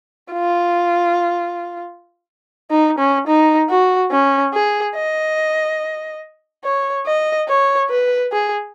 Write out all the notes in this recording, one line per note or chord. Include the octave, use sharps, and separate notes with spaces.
F4
D#4
C#4
D#4
F#4
C#4
G#4
D#5
C#5
D#5
C#5
B4
G#4